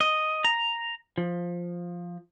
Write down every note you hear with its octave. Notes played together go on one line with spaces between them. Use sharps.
D#5
A#5
F3